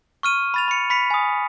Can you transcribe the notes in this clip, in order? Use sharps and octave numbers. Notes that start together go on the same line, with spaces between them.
C#6 F6 D#7
B5 A6 F7
B5 C#7
B5 B6 C#7
G#5 D#6